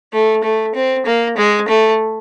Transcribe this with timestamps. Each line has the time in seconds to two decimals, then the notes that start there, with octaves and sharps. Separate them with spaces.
0.13 A3
0.44 A3
0.75 C4
1.06 A#3
1.37 G#3
1.69 A3